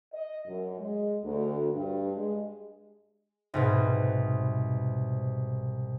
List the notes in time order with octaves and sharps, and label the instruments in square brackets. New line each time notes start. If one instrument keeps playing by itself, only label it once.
[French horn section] D#5
F#2
G#3
D2
G2
G#3
[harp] C2 G#2 B2